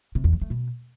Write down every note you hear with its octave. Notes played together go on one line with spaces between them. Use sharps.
C3
E2
F3
A3
B2